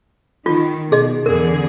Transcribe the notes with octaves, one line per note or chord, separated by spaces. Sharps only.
D#3 F4
B2 G#4 D#5
E2 D3 G#4 A#4